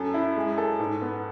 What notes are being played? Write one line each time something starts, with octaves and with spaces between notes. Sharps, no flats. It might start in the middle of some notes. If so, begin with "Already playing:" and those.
Already playing: F#2 A4
E4
G#3
A4
G#2
B3